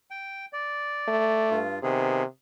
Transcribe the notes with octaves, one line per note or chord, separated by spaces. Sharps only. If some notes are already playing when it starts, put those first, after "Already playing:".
G5
D5
A3
G2 F4
C3 D#3 B3 G#4